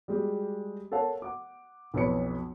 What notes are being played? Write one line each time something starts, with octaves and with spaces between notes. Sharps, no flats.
G3 G#3 F#4 G4
A4 A#4 C#5 F5 F#5 A5
F#5 D6
B1 F2 E4 B4 C#5 C#7